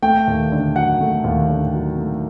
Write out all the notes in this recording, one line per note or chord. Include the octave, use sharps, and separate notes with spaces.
A3 G5
D#2
D3
F#3 F#5
A3
D#2
D3
F#3
A3